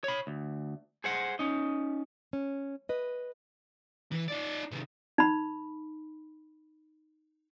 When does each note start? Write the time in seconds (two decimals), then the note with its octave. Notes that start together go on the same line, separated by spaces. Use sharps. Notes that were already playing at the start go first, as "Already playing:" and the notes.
0.04 C#5 B5
0.27 D2
1.04 G#4 C5 F#5
1.39 C#4 D#4
2.33 C#4
2.89 B4 D#5
4.12 E3
4.28 D#4 D5
4.71 C3 D#3
5.18 D#4 B5